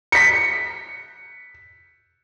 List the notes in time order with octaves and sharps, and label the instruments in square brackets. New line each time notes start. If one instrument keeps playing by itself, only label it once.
[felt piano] B6 C#7